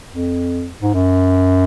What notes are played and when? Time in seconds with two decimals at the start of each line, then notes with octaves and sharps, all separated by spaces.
0.12 F2
0.82 G#2
0.94 F#2